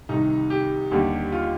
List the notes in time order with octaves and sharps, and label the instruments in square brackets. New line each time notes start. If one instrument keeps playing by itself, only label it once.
[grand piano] C2 C3 D#3 D#4
G4
D#2 D3 G3
F4